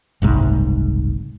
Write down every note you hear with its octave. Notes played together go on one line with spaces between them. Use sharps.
F#1 C2 G#2